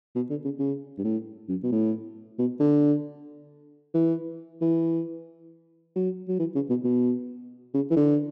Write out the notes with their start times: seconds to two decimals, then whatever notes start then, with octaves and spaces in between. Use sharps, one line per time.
0.15 B2
0.30 D3
0.44 C#3
0.59 C#3
0.98 G2
1.04 A2
1.49 F#2
1.63 B2
1.72 A2
2.39 B2
2.60 D3
3.94 E3
4.61 E3
5.95 F#3
6.28 F#3
6.39 E3
6.55 C#3
6.69 B2
6.84 B2
7.74 C#3
7.90 E3
7.96 D3